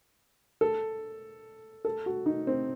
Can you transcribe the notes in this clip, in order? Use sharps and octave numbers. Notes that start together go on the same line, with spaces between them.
A4
A4
F#4
D#4
C4